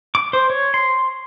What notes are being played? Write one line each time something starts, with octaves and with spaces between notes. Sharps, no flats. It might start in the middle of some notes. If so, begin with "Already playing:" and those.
D6
C5
C#5
C6